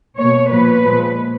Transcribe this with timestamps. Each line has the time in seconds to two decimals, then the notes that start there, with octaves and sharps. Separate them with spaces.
0.18 B2 A#3 C#5
0.50 A#2 F3 A#3 B4
0.84 A#2 F3 G#3